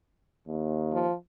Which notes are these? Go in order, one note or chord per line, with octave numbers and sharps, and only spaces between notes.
D#2
F3